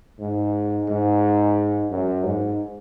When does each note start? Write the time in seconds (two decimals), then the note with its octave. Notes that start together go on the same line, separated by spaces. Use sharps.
0.20 G#2
0.88 G#2
1.90 F#2
2.24 G#2